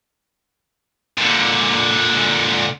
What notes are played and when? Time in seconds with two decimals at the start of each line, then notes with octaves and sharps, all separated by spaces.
1.18 A#2 D3